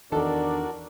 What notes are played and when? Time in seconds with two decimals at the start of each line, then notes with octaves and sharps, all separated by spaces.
0.12 E2 D#3 D4 F#4 A4 A#4 D5